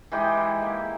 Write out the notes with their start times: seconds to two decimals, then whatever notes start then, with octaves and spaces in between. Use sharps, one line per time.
0.12 E3 G#3 D#4 G4
0.37 E4
0.62 A#3